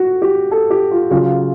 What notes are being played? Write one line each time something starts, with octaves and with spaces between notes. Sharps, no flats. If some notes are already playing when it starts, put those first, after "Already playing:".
Already playing: F#4
G4
A4
G4
F4
C#3 F#3 F4